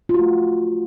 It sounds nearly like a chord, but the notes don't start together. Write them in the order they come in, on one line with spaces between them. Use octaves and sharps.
F4 F#4 A3